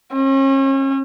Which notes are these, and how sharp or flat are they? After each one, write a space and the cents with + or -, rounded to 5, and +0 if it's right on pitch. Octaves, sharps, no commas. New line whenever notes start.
C#4 -40